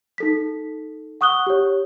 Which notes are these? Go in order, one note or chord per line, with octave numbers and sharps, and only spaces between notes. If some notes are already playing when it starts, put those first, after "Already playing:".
D#4 A4 B6
F#5 C#6 D#6 F#6 G7
G4 C#5